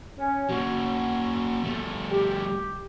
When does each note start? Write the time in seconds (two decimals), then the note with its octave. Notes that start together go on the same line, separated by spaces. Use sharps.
0.17 C#4
0.49 A#3 C#4 F#4
1.64 G3 A3
2.10 G4